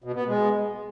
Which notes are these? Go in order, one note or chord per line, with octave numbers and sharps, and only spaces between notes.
B2
B3
G#3